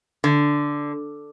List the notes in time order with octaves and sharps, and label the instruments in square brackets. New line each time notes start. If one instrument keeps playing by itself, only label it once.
[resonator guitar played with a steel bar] D3